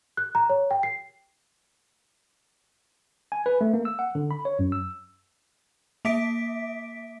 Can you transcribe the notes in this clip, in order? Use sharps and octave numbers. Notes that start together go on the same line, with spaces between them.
F#6
A#5
C#5
G5
C7
G#5
B4
A3
A#3
E6
F#5
D3
B5
C#5
F#2
E6
A#3 E5 D6 B6 D7